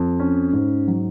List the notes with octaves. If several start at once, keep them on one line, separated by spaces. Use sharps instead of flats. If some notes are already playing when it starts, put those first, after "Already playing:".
Already playing: F2
C#4
G#2
F#3